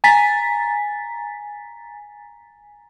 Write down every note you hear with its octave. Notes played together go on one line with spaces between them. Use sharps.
G#5 A#5 A6 B6